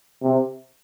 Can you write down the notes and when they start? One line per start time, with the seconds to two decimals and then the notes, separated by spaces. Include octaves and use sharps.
0.23 C3